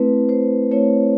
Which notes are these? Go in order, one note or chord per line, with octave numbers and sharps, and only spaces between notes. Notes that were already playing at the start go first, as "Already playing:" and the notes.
Already playing: A3 C4 E4 B4
C5
A3 C4 E4 C#5